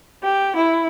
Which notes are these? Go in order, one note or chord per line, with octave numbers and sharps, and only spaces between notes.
G4
E4